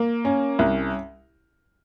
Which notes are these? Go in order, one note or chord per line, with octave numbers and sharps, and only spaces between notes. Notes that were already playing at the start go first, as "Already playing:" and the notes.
Already playing: A#3
C#4
C2